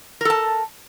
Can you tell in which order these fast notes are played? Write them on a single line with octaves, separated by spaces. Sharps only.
A#4 A4 A5